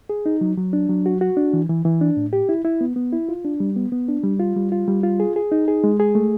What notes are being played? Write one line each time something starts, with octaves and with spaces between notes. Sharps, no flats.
G#4
D#4
F#3
F#3
D4
F#3
F#4
F#4
D4
E3
E3
E3
D4
A2
G4
E4
E4
B3
B3
E4
F4
D4
G3
B3
B3
D4
G3
F4
G3
F4
G3
F4
G#4
G#4
D#4
G#4
G#3
G#4
A3